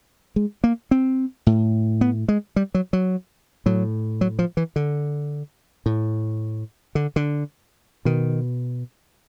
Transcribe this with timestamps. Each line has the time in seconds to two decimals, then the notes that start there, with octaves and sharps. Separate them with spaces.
0.36 G#3
0.64 A#3
0.91 C4
1.47 A2
2.01 B3
2.28 G#3
2.56 G3
2.75 F#3
2.93 F#3
3.66 A2 F#3
4.21 F#3
4.39 F3
4.57 E3
4.76 D3
5.86 A2
6.95 D3
7.16 D3
8.05 B2 D#3